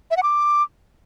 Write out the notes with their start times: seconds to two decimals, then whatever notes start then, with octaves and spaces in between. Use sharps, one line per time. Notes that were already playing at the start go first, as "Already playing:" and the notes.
0.11 E5
0.17 F#5
0.23 D6